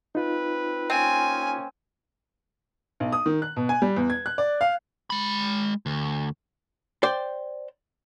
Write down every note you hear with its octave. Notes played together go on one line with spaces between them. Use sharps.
C4 D#4 F4 B4
A#3 C4 C#4 G#5
B1
D#6
D#3
F#6
B2
G#5
G3
E2
G#6
F#6
D5
F5
G#3 B5
D2
C5 D5 G5